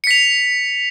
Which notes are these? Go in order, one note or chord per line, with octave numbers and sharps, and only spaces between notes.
B6 C#7 F7